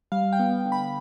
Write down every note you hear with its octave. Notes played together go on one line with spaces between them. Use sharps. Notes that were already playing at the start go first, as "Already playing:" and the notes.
G3 F5
G5
B3
D3
B5